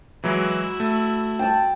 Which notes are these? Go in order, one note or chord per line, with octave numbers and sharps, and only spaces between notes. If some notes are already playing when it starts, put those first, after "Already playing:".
E3 F#3 G#3 E4 F#4
A3
G5 A5